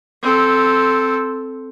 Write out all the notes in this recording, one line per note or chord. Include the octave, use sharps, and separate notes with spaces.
C4 A4